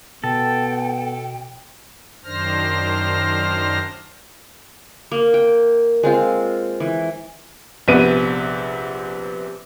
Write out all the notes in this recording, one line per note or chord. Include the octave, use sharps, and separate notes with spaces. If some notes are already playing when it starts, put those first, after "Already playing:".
B2 B3 A4 G5
F#2 D#3 D4 C5 F6 A#6
A#3
G5
G#3 C4 F4
E3
A#1 C3 B3 D#7